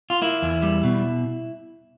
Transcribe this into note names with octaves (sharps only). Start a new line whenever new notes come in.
F4
A#3 E4
E2
G3
B2